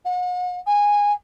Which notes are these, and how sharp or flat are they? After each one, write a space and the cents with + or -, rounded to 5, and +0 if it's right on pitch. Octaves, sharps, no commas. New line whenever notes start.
F#5 -40
G#5 -15